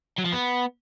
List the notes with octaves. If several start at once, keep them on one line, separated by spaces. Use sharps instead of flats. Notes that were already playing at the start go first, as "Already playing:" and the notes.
F#3
F3
B3